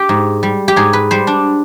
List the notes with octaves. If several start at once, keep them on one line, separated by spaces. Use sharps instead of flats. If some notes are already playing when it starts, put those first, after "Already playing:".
Already playing: G4
G#2
G3
G4
G#2 G#4
B4
G3 C5
D4